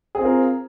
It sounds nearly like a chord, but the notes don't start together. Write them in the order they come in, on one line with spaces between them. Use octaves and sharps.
G#4 C4 F4 A#4